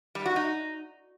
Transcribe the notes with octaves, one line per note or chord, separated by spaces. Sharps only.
G3
F#4
D#4